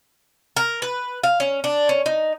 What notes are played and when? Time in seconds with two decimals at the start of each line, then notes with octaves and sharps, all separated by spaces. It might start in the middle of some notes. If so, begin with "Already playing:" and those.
0.57 A#4
0.82 B4
1.23 F5
1.40 C#4
1.64 D4
1.89 C#4
2.06 D#4